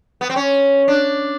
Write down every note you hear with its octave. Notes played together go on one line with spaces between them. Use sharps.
B3
C4
C#4
D4